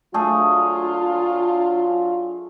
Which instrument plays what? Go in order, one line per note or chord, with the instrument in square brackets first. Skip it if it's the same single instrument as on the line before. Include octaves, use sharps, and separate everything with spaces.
[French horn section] F#3 D4 F4 [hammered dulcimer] A3 G#4